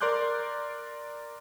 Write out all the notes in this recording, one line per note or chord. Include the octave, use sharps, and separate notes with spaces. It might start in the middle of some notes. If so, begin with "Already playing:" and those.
A#4 D5 C6 D6 F#6 G6